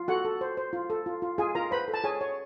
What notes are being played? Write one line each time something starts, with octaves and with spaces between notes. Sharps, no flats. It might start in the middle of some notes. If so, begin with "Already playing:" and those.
Already playing: F4
F#4 A4 F#5
A4
C5
C5
F4
A4
F4
F4
F4 G#4 G#5
F4 A#4 A#5
B4 C5 B5
A4
A5
G#4 C#5 G#5
C#5